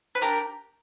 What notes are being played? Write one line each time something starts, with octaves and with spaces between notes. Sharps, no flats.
B4
D4 G4 A#4